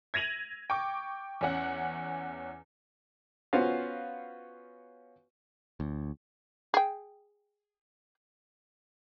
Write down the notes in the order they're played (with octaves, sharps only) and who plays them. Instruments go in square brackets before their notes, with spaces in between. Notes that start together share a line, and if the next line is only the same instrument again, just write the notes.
[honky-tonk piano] G#6 A#6 D#7 F7 F#7
G5 C#6 D6
E2 C#4 F#5
[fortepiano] B3 C#4 F4 F#4 C5 F5
[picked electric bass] D2
[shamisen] G#4 G5